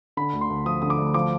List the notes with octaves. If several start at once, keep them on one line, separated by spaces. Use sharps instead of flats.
D3 B5
D2
C6
D2
F3 D#6
D3 D#6
D6
D2
F3 D6